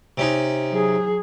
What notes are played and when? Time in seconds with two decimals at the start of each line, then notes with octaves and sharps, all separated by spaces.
0.18 C3 C#4 D#4
0.71 F#3 G#4